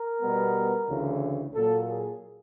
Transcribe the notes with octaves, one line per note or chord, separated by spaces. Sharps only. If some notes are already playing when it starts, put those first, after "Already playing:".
Already playing: A#4
B2 G3 B3
D2 C#3 E3
A#2 F#3 A#3 A4
G#4